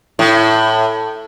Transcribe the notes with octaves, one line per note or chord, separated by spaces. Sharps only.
A2